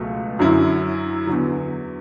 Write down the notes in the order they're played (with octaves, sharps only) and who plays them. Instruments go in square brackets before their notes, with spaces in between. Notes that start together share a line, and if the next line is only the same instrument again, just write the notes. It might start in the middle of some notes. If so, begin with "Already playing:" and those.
Already playing: [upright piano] C#2 B2 F#3 A3
F#2 D3 F#3 C#4 E4
E2 D3 F#3